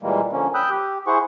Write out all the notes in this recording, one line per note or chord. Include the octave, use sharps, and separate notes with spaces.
A#2 E3 G3 G#3 A#3
D3 F3 A#3 C#4
G5 B5 D#6 E6 F#6 G6
G4
E4 G#4 C5 F#5 C#6